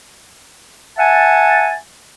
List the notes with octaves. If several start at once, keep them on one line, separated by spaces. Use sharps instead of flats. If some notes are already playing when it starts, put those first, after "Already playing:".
E5 F#5 G#5 A5